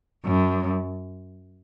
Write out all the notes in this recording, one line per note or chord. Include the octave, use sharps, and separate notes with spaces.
F#2